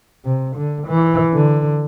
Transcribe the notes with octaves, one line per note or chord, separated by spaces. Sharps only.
C3
D3
E3
D3